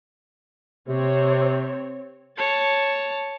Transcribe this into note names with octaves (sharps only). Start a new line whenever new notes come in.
C3 C4 C#5
C#5 A5